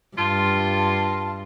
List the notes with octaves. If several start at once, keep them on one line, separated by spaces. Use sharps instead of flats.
G2 F4 A5